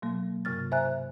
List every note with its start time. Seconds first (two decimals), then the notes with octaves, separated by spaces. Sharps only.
0.02 B2 F#3 A#3
0.45 G2 C3 F6 A6
0.72 C5 E5 G#5 A#5 F#6